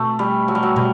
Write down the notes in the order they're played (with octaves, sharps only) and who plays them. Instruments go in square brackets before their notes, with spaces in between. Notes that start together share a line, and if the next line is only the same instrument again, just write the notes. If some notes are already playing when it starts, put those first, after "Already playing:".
Already playing: [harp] B2 C4 F#4 [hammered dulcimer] A3
[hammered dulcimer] G3
F#3
G3
F#3
[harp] B2 [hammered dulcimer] G3